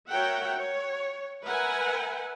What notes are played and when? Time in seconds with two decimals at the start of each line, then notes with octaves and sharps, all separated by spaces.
0.11 F#4 A#4 C#5 E5 F#5 G5
0.57 C#5
1.45 A#4 B4 E5 F#5 G#5